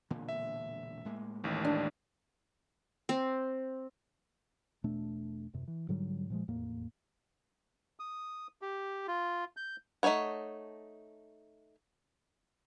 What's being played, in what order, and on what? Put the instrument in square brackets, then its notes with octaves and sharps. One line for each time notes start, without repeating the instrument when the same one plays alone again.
[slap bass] E1 A#2 D3
[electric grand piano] E5
[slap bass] A2 G#3 A#3
[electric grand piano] A1 D#2
[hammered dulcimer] D4
[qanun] C4
[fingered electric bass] E1 B2 A3 D4
D#1 F#2 C3
E3
G#2 D3 F#3 G3
A#2 F3 G#3
F1 E2 A2 A#3
[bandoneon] D#6
G4
F4
G6
[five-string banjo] A3 D#4 F#4 C#5 F#5